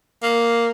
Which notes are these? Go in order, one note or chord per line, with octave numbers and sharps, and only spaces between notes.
A#3